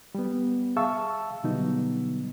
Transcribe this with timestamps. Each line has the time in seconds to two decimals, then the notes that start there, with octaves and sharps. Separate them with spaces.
0.15 G3 B3
0.76 G#4 E5 F5 A5 C#6 E6
1.43 B2 D3 F#3 G3 B3 D#4